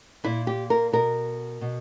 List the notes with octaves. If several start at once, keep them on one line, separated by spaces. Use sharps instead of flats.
A#2 E4
G4
A#4
B2 A#4
B2